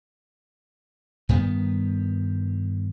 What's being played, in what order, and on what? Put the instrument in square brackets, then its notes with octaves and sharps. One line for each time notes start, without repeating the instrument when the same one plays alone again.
[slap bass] G2 D#3 B3